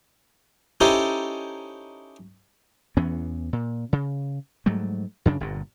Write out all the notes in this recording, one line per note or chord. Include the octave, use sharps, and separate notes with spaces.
C#4 D#4 E4 G4 A4 C5
E2 E3 B3 C#4
A#2
C#3
G#2 F#3 G3 A3
F#2 C#3 D4
G1 G2 A#2